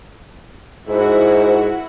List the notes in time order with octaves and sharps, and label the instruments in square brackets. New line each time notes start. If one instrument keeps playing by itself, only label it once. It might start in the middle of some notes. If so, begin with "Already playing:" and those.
[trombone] G#2 [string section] E4 F#4 A#4 [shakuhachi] C5